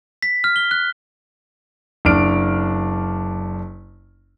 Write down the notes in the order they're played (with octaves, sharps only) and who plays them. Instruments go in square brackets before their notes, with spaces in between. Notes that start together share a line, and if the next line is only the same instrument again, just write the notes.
[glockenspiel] B6
F6
G7
F#6
[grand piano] F#1 D4 F6 D7